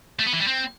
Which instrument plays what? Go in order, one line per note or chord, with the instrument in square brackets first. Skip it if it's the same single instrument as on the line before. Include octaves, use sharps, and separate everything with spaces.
[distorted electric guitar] A3
B3
E3
G3
C4